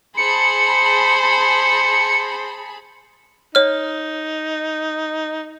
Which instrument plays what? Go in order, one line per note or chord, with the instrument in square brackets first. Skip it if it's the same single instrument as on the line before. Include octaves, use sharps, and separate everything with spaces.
[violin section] G#4 A5 B5 [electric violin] C5 [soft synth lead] C#7
[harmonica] D#4 [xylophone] C#5 F6